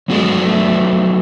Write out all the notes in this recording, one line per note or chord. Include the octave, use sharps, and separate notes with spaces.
F#3 G#3 B3 F#4 A4 D5
A3